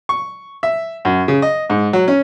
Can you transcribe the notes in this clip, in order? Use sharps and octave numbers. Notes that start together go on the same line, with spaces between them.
C#6
E5
F#2
C#3
D#5
G#2
F#3
C#4